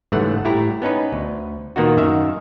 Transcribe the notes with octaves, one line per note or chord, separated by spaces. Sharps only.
G1 G#2 C#3 E3 A3 F#5
A2 A3 E4 G4 A#5
B3 C#4 D#4 B4
D2
A#2 D#3 A#3 B3 D#4 F#4
F#2 D#3 E5 F5